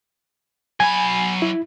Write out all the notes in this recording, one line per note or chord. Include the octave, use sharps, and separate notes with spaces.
F#3 G#5 B5
E4